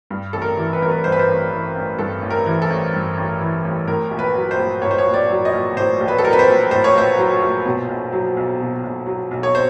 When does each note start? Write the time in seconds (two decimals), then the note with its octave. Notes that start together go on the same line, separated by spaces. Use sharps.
0.11 G2
0.33 A1 A4
0.42 A#4
0.57 E3
0.73 B4
0.82 A1 A#4
0.91 B4
1.04 G2 C5
1.12 B4
1.19 C5
1.28 A1
1.51 E3
1.76 A1
1.99 G2 A4
2.22 A1
2.30 A#4
2.46 E3
2.62 A4
2.70 A1
2.93 G2
3.18 A1
3.41 E3
3.65 A1
3.87 A2 A#4
4.11 A#1
4.19 B4
4.35 F#3
4.51 C5
4.59 A#1
4.82 A2 C#5
4.91 C5
4.98 C#5
5.06 A#1
5.14 D5
5.30 F#3
5.45 D#5
5.53 A#1
5.76 A2 C5
6.00 A#1
6.08 B4
6.18 A4
6.24 F#3 A#4
6.33 B4
6.39 C5
6.47 A#1
6.71 A2 C5
6.84 C#5
6.95 A#1 C5
7.18 F#3
7.42 A#1
7.65 B2
7.89 B1
8.12 F#3
8.37 B1
8.60 B2
8.84 B1
9.07 F#3
9.31 B1
9.43 C#5
9.55 C5